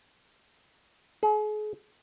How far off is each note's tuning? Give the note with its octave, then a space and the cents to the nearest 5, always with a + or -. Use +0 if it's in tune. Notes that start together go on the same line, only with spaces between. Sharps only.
G#4 +40